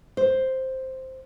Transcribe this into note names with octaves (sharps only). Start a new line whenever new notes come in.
C5